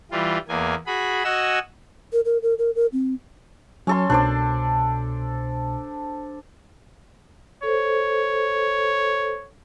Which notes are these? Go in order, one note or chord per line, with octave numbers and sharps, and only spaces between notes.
E3 G3 F4
E2 A#3 G#5
F#4 G#4 B5
F#4 D#5 F#5 G#5 E6
A#4
A#4
A#4
A#4
A#4
C4
F#3 C#4 A4 C6
C2 B2 D4 C5 D5
A4 C5 C#5